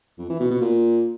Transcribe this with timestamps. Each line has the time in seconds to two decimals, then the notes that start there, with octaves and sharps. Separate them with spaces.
0.18 F2
0.29 E3
0.40 B2
0.51 B2
0.61 A#2